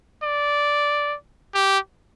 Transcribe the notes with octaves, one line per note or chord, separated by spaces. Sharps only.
D5
G4